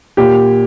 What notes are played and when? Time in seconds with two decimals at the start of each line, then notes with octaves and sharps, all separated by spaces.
0.17 A#2 G4